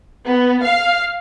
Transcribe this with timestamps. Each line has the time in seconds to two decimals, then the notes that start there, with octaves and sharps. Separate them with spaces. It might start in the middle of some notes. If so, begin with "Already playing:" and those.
0.25 B3
0.62 F5